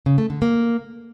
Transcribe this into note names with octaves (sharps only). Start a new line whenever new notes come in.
C#3
A3
D3
A#3